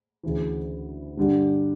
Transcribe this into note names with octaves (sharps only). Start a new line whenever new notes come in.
D2 C#3 E3
G2 D3 G3